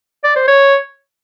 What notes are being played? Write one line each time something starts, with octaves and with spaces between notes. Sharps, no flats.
D5
C5
C#5